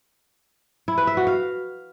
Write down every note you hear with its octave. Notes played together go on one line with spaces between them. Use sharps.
E4
B4
E5
F#4
F5